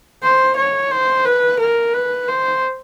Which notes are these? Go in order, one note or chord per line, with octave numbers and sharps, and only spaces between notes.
C5
C#5
C5
B4
A#4
B4
C5